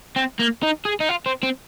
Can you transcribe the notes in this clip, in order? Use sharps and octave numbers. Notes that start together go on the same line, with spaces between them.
C4
A#3
D#4
G#4
D#4
F4
C4
C4